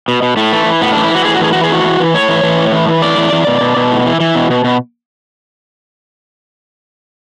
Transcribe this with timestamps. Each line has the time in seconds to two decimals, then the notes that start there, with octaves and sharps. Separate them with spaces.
0.08 B2
0.22 B2
0.37 A2 A3
0.52 E3
0.66 E3
0.81 A2 B3
0.93 D4
0.96 E3
1.04 E4
1.11 E3 F#4
1.25 A2 G#4
1.34 F#4
1.40 E3 G#4
1.53 E3 F#4
1.64 G#4
1.70 A2 F#4
1.84 E3
2.00 E3
2.14 A2 C#5
2.29 E3
2.43 E3
2.59 A2
2.72 E3
2.88 E3
3.02 A2 D5
3.18 E3
3.33 E3
3.47 B2
3.61 B2
3.77 B2
3.91 A2
4.06 E3
4.20 E3
4.35 B2
4.50 B2
4.64 B2